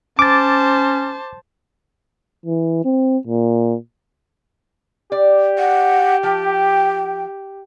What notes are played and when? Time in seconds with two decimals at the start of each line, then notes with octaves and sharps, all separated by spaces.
0.19 C#4 C5 A5 D6 A6
2.46 E3
2.85 C4
3.27 A#2
5.12 G4 D5
5.59 F#5
6.23 F3 G5